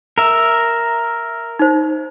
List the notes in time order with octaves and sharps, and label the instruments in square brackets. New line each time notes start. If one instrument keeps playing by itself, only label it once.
[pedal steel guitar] A#4 E5
[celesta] D#4 C5